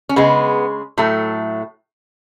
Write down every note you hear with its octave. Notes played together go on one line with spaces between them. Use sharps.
C#4
C#3 G#3 B3
A2 F#3 A3